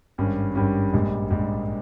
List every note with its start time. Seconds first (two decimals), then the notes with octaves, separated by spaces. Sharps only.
0.18 G#1 G2 G3 C#4
0.55 G#1 G2 G3 C#4
0.93 A#1 G#2 G3
1.31 A#1 G#2 G3